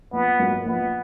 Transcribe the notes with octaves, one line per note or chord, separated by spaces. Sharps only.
A#1 B3
G#2 F#3 A#3
A#1 B3